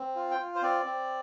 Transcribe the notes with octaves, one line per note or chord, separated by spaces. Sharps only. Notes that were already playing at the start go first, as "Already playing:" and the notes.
Already playing: C4
F4
G5
F4
C5
C4 D5
C4